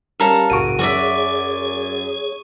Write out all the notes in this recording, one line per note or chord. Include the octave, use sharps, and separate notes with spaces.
G3 C#4 A4 A#4 F5
F#1 C2 A2 F#4 C#6 D7 D#7
F#2 F#4 G#4 C#5 D5 E5